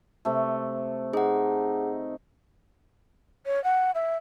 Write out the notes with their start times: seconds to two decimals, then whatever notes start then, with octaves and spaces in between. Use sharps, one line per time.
0.25 C3 A3
1.13 D#4 G#4 F#5
3.46 C#5
3.64 F#5
3.95 E5